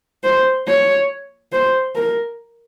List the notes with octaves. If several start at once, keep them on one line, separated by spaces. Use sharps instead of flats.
C5
C#5
C5
A#4